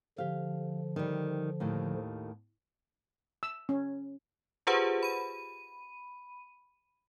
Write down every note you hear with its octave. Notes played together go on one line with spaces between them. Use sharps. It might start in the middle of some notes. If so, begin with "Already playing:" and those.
D3 F3 G4 F5
D#3 G3
D#2 A2 D#3
E6
C#4
F4 G4 G#4 B4 C5 F#5
B5 D#7